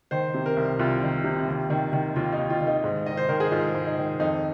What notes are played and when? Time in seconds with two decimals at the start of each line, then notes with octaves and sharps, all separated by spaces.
0.11 D#3 C5
0.34 C3
0.46 A#4
0.57 C2
0.79 C2 F4
1.03 D#3
1.24 C3
1.48 D#2
1.70 D#3
1.93 D#3
2.16 D#2 F4
2.33 D#4
2.38 D#2
2.50 F4
2.61 D#3
2.67 D#4
2.84 G#2
3.06 D#3 D#5
3.17 C5
3.29 D#3 A#4
3.40 G#4
3.52 G#2 F4
3.75 G#2
3.86 D#4
3.98 D#3
4.19 F2 D#4